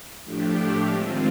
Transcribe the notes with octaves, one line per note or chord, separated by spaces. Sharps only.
A2 F3 A3 D4 G4
D#3 G#3 C4 F4